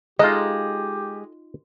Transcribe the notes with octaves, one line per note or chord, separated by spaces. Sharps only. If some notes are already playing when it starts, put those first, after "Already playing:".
G#3 D#4 F4 G4 A4 D#5